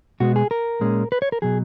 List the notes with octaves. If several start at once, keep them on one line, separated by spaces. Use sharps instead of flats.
B2 G#3 B3 F#4
G#4
A#4
A#2 G#3 C#4
B4
C#5
A#4
B2 F#3 G#4